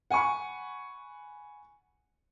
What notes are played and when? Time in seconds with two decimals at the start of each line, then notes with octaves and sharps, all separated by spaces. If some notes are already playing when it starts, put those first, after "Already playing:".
0.11 F#5 G#5 B5 C#6